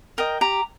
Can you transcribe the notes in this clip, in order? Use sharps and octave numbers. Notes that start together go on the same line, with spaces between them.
A#4 D#5 G5
G4 A#5